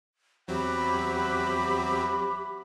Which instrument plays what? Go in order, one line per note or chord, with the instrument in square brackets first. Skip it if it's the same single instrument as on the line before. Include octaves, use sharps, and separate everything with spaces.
[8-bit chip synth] E2 F#3 C4 [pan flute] G4 [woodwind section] E5 F#5 B5